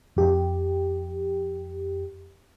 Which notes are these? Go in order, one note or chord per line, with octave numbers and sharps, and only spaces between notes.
F2 G4